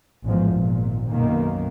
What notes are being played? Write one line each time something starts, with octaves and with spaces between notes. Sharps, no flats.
A1 E2 G#2 F3
G#1 A#2
B1 F#2 B2 D#3 A#3